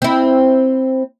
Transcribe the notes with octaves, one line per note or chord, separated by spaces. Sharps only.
C4 E4